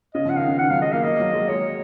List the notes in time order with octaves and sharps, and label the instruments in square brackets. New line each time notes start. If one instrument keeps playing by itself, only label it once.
[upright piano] C#3 [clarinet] D#5
[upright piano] F3
[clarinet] F#5
[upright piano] D#3 [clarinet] F5
[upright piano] C#3
[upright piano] D#3 [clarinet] F#5
[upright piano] F#3 [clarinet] F5
[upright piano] G#3 [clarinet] D#5
[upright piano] A#3 [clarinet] F5
[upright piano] A#3 [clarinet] D#5
[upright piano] F#3
G#3
[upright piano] G#3 [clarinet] C#5